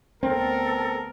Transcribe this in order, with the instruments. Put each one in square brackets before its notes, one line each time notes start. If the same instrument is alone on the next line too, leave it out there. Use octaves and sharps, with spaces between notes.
[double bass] D2 B3 [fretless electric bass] C4 [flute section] A4 [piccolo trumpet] A#4